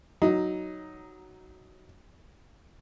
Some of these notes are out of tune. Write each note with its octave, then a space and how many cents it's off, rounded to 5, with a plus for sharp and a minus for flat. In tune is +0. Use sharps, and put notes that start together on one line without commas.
F#3 +5 D#4 +0